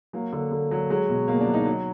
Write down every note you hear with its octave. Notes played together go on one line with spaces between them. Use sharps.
F#3 A#3
D3
D3
F#3
F#3 G#3
B2
B2 A#3
D4
F#3
D#4
F#3